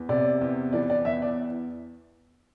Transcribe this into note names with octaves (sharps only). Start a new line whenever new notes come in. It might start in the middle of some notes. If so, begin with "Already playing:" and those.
Already playing: E2
C3 D5
E2
E3 D5
D5
E2 E5
D5